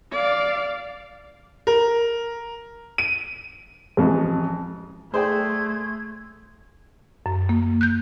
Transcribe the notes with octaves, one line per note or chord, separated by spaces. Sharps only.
D5 F5
A#4
D#7
A1 F2 G#3
A3 G#4 C5 D5 G5 C6 G#6
F#2
A#3
F#6 G6